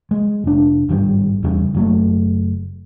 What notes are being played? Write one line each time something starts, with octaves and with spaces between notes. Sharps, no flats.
G#3
F1 D4
G#1 G2 B2 G3
E2 C#3 G3
F#1 F#3 A3